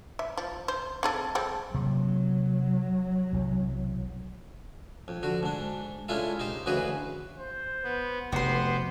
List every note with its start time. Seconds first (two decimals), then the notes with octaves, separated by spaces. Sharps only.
0.19 E5
0.37 F3
0.68 C5
1.03 C4 G#4 A4
1.35 G#3 C4 A4
1.74 C3 F#3 A#3
3.33 B1 C3 E3
5.08 F2
5.23 D3 F#4
5.43 G#2 D4
6.08 G#3 C#4 D4 E4 F4 A4
6.39 D#4 G4 C5
6.66 D2 C#3 E3 F#4 G#4 B4
7.39 C5
7.83 B3
8.32 F1 B3 F#4 G4 C5 C6